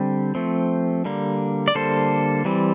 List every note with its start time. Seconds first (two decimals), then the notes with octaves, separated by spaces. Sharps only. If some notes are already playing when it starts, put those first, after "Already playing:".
Already playing: D3 G3 C4 G4
0.35 F3 A3 C4
1.05 D3 G3 A#3
1.68 D5
1.75 D3 G3 A#3 A4 C5
2.45 E3 G3 C4